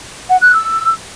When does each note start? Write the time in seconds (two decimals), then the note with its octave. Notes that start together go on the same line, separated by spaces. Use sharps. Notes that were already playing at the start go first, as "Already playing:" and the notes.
0.29 F#5
0.41 F#6
0.53 E6